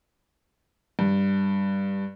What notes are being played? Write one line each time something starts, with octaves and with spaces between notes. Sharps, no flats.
G2